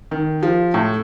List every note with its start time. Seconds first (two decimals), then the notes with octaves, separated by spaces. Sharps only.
0.11 D#3
0.43 F3
0.74 A2 A3